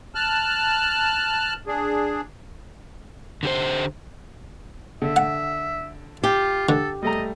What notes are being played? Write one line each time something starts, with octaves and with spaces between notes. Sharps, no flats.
A5 F6 F#6
D4 G#4
D3 G4 C5
D3 E5
F#5
F4 G4
D3 A4
G3 A3 D#5 A#5